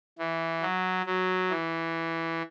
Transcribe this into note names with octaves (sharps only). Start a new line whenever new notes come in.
E3
F#3
F#3
E3